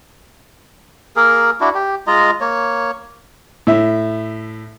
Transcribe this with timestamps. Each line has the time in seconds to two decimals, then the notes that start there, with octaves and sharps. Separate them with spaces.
1.16 A#3 G#4 A#4
1.61 D4 E4 F#4
1.75 G4
2.07 G#3 F4 D#5 A#5
2.41 A#3 C#5
3.67 A2 E5